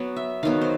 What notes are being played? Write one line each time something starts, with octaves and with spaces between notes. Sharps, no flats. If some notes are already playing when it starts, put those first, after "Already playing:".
Already playing: F#3 B3
E5
D#3 F#3 B3 F5
C5